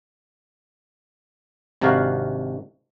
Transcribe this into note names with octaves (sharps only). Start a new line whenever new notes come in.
G#1 C3 D4 F#4 A#4 F5